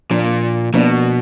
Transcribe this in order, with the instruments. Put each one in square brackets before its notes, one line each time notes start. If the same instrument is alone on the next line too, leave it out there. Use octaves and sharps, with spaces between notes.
[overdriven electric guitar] A#2 [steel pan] F3 A#3 D4
[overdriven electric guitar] B2 [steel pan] F3 A#3 D4